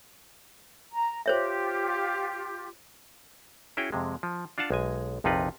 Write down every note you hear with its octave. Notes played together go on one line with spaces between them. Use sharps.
A#5
F4 G4 C5 C#5 E5
C#4 E4 F#4 G#4 C#5 G5
F2 C3 G#3
F3
D4 F4 F5 F#5 A5
B1 G#3 G#5
A#1 F2 C3 D#4 F4 B4